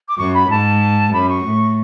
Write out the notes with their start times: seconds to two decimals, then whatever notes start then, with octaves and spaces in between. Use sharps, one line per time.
0.09 D6
0.18 F#2 C#6
0.34 B5
0.50 G#2 A5
1.13 F#2 B5
1.29 C#6
1.45 A2